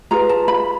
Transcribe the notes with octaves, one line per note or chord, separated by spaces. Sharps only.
F4 G#4 B4 A#5
A5
B5